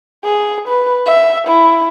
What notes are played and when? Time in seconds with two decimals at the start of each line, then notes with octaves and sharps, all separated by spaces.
0.25 G#4
0.68 B4
1.06 E5
1.48 E4